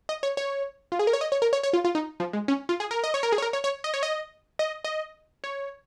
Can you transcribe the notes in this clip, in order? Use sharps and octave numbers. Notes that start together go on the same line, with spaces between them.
D#5
C#5
C#5
F4
G#4
A#4
C#5
D#5
C#5
A#4
C#5
C#5
F4
F4
D#4
F3
G#3
C#4
F4
G#4
A#4
D#5
C#5
A#4
G#4
C#5
A#4
C#5
C#5
D#5
C#5
D#5
D#5
D#5
C#5